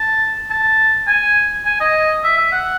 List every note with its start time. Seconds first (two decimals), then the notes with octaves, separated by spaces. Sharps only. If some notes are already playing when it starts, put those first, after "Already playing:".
Already playing: A5
0.50 A5
1.08 G#5
1.66 G#5
1.81 D#5
2.24 E5
2.37 E5
2.52 F#5